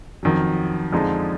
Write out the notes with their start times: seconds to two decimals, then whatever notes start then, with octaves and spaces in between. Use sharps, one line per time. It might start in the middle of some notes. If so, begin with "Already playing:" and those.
0.23 F2 D#3 F#3
0.93 F2 D3 F3 G#3 D#4